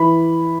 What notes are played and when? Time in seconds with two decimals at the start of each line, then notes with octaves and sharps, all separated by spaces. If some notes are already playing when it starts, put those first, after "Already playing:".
Already playing: E3 B5